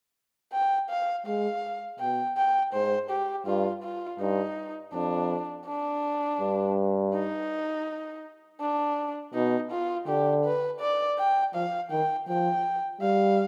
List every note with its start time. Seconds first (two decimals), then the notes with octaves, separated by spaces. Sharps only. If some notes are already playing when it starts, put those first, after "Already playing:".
0.53 G5
0.90 F5
1.26 G#3 F5
1.99 B2 G5
2.37 G5
2.73 G#2 C5
3.10 G4
3.46 G2 F4
3.83 F4
4.20 G2 D#4
4.94 F2 D4
5.66 D4
6.41 G2
7.14 D#4
8.60 D4
9.34 B2 D#4
9.71 F4
10.08 D3 G4
10.45 B4
10.80 D5
11.18 G5
11.54 F3 F5
11.91 D#3 G5
12.28 F3 G5
13.01 G3 F5